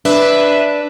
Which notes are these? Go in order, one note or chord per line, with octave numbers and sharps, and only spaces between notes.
D4 B4 E5